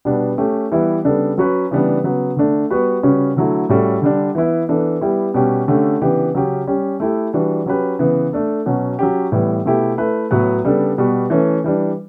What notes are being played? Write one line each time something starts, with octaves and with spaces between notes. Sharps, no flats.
B2 G3 B3 D4
A3 C#4 G4
E3 G3 B3 E4
C#3 G3 B3 D4 A4
F#3 C#4 F#4 B4
C#3 E3 G3 B3 D4
C#3 F#3 B3
D3 A3 D4
G3 B3 F#4 B4
C#3 G3 C#4 F#4 B4
D3 F#3 A3 E4
A2 G3 C#4 F#4 A4
D3 G3 D4
E3 B3 E4 B4
E3 B3 D4 A4
G3 B3 E4 G4
B2 G3 C#4 G4
D3 A3 C#4 G4
C#3 E3 B3 D4 G4
C#3 F#3 C#4 G4
G3 C#4 G4
A3 E4 G4
E3 G3 D4 F#4
F#3 C#4 G4 B4
C#3 E3 B3
A3 D4 A4
B2 F#3 C#4
F#3 C#4 G4
A2 E3 G3 B3
B2 A3 E4 G4
A3 E4 B4
A2 F#3 B3 F#4 B4
C#3 G3 B3 D4 A4
B2 G3 B3 F#4
E3 A3 C#4
E3 G3 D4